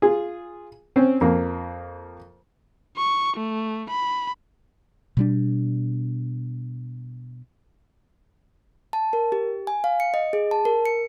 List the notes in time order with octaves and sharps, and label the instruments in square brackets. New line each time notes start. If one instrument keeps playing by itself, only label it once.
[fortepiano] F4 G#4
C4 C#4 C5
F2 A#3
[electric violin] C#6
A3
B5
[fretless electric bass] B2 G3 D4
[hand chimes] A5
A#4
G4
G#5
F5
C#7
D#5
G#4
A5
A#4
C#7